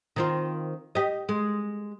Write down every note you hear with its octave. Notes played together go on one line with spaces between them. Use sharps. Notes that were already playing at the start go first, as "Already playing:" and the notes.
D#3 C4 F4
G4 D#5
G#3